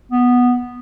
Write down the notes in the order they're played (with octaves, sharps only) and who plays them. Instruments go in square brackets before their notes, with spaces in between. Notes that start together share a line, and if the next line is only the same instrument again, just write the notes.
[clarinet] B3